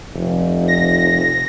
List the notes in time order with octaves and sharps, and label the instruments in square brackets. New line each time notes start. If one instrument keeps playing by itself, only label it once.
[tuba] F1
[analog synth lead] A#6